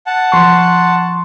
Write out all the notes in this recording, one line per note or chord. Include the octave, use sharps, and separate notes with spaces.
F#5 A5
F3 C6 C#6